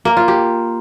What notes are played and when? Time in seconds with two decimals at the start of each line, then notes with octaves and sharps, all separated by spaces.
0.05 A#3
0.17 F4
0.28 G4